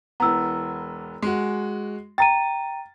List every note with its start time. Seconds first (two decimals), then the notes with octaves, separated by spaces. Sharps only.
0.20 E1 E3 B3 A#5 E6
1.22 G#3 F#4
2.18 G5 A#5 A6 D#7